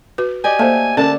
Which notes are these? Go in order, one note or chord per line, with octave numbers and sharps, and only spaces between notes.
F#4 B4
G4 D5 D#5 G#5
A3 A#3 C5
D3 C#4 D4 A#4 A5